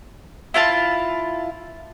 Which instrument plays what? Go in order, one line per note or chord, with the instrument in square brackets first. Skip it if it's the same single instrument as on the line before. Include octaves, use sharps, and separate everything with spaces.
[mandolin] E4 F4 F5 A5